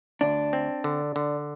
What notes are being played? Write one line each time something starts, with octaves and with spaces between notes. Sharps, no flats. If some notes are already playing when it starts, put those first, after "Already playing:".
D2 D4
C4
D3
D3